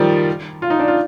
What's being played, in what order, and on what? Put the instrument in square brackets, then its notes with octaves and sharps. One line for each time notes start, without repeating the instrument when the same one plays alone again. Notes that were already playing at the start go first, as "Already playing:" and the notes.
Already playing: [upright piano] D#3 F3 G3
F4
D#4
D4
F4